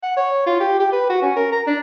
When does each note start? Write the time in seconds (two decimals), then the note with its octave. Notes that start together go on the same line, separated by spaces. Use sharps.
0.03 F#5
0.17 C#5
0.46 F4
0.60 G4
0.80 G4
0.92 B4
1.10 F#4
1.22 C#4
1.36 A#4
1.52 A#5
1.67 D4